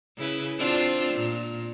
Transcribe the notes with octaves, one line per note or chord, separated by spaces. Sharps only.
C#3 E4 B4
C4 D4 F4
A#2